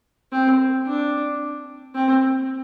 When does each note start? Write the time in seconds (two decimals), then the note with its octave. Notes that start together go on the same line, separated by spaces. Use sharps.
0.32 C4
0.87 D4
1.95 C4